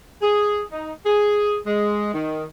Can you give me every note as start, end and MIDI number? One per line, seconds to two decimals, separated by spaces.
0.22 0.62 68
0.72 0.93 63
1.06 1.56 68
1.66 2.13 56
2.14 2.45 51